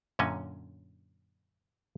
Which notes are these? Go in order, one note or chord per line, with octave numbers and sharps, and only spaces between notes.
F#2 A#2 D3 C#4 D#5